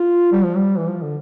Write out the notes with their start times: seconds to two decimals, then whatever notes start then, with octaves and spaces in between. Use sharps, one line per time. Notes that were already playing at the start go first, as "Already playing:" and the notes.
Already playing: F4
0.32 G3
0.44 F3
0.57 G3
0.77 E3
0.87 F3
1.02 D3